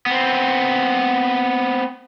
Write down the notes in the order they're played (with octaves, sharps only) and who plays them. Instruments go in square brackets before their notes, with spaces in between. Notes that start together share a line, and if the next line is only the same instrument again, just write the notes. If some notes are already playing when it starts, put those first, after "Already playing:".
[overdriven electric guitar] B3 C4